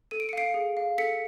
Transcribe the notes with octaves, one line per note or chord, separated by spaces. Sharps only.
A4 D#7
D7
C#7
F5 C7 D7
G#4
F5
A4 B6 C#7